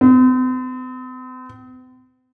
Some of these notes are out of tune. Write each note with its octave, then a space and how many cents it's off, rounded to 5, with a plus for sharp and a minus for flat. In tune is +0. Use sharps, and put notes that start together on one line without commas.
C4 -45